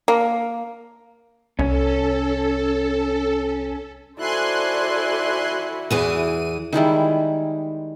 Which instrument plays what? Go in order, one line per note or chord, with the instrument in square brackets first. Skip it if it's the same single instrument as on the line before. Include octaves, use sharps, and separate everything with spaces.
[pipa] A#3
[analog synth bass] C2 [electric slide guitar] C#4 [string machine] A4
[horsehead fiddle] E4 F#4 [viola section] A4 C5 D5 [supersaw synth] G#5 C6 F#6
[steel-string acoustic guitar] E2 E3 G#4 [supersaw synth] D#7
[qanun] D#3 G3 G#3 E4